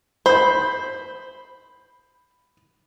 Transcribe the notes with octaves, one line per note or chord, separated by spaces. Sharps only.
C5 B5 G6